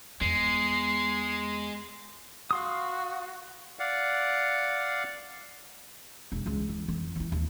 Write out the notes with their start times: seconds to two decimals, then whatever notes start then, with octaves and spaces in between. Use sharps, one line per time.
0.21 E2 G#3 B3 C7
2.51 F#4 F5 C6 D#6
3.79 D5 F5 F#5
6.32 E1 G2
6.46 C#2 E3
6.69 E3
6.88 F2 E3
7.16 E3 E4
7.32 D#2